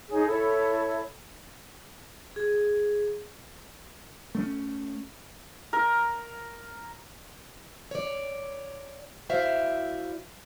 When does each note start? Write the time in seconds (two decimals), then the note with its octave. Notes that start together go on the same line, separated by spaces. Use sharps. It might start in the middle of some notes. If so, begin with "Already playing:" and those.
0.11 D#4 G#4 C#5
0.26 E4 A4 C#5 E5
2.36 G#4
4.35 A3 B3 C#4
5.73 A#4
7.91 C#5 D5
9.29 E4 F#4 C5 D5 E5 F5